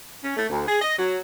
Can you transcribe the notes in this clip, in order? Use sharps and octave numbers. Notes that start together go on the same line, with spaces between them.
C#4
A3
D2
G#4
D#5
F#3